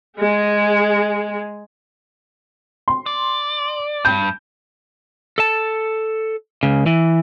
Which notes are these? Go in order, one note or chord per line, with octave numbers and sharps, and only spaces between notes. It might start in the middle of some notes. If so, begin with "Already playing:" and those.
G#3 G#4
C6
D5
G2 G6
A4 A5
C#2 C#3
E3